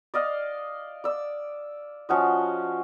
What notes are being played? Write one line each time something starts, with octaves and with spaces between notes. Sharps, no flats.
D5 D#5 F5
D5 E6
F3 C#4 F#4 D#5